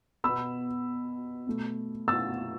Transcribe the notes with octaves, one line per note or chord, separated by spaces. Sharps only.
B2 B3 B5 E6
B2 A3
E6 A6